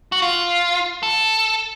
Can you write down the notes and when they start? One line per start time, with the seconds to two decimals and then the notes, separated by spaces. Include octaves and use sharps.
0.12 F#4
0.22 F4
1.03 A4